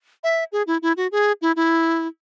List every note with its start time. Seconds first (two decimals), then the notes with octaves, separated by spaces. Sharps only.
0.24 E5
0.52 G#4
0.67 E4
0.82 E4
0.97 F#4
1.12 G#4
1.42 E4
1.56 E4